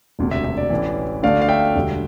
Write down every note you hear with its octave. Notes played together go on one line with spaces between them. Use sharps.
E1 D2 C3
E5
E5
D5
A1 A2 E3
D2 D3 A3 D5 F5
F5
E5 G5
E1 D2 D3 G3